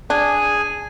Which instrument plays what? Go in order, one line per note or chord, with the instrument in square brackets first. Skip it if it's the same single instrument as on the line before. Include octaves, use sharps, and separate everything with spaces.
[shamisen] D4 [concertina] G#4 G#5